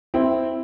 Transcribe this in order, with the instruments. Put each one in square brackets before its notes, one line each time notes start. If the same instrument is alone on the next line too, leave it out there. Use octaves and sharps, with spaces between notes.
[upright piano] C4 E4